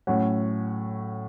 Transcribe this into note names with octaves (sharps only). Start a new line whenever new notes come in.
A2 F#3 C#4 F#5